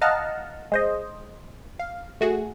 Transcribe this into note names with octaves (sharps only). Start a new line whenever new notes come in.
D#5 F5 F#5 A5 A#5 F6
G#3 C5 D#5
F5
A3 F#4 G#4